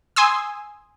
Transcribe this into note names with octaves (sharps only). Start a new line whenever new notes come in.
G#5 C6 D#6 E6